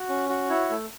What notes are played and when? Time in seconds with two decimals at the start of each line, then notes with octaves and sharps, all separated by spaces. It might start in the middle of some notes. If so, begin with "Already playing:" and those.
Already playing: F#4
0.09 C#4
0.29 F#4
0.49 E4 C#5
0.70 A3